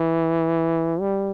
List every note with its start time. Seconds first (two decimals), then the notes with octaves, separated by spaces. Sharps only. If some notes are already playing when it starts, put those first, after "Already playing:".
Already playing: E3
1.00 G3